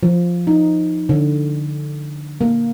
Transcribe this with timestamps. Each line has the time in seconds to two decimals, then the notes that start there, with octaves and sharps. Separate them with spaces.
0.03 F3
0.47 D#4
1.09 D3
2.41 A#3